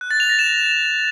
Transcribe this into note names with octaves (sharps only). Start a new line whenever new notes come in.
F#6
A6
F7
A#6
E7